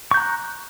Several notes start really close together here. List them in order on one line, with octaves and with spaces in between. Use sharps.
C#6 G6 A#5 F#6